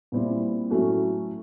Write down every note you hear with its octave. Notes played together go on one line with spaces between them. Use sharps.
A#2 G3 C4 E4
A2 F#3 A3 C#4 F#4